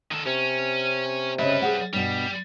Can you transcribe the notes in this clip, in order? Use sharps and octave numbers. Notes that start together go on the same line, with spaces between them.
D#3 A4
C3 C#4
C#3 G3 B4 D#5 E5
G#4 C5 F#5
G2 B2 G3